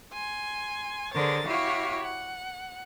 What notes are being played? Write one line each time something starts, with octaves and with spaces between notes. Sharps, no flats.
G#5 C6
D3 G#4 A#4 C5 C#5 A6
E4 F#4 G4 C#5 F5
F#5